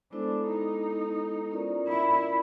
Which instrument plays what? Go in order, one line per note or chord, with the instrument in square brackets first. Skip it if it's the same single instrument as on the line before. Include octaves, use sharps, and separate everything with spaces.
[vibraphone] G#3 B3 E4 A4 C5 [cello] D4
[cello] D#4
[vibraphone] C#4 F4 A#4 D5
[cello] E4